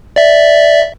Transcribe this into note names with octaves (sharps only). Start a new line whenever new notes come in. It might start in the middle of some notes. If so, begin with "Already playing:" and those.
D5 E5